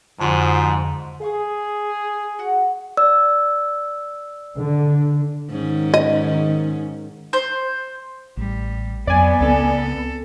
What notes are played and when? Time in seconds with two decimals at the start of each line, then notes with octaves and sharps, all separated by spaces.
0.20 F2 G#2 D3 F3 F4 F#4 C5
1.22 G#4 F5 C#6 D#6
2.39 F#4 F#5
2.97 D5 E6
4.57 D3
5.50 G#2 D#3 C#4
5.94 D#5
7.33 C5
8.37 A1 G3
9.07 F2 F#3 B3 D5 G#5
9.40 C#2 C4 A4